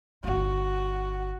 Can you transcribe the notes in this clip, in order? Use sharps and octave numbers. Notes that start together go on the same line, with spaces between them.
G1 D#4 F#4